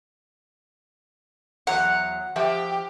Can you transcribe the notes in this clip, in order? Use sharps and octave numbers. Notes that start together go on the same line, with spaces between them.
E2 F#3 F#5 A#5
F3 G4 E5 G5